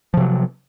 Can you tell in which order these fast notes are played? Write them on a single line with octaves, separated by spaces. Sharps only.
F3 C3 F#3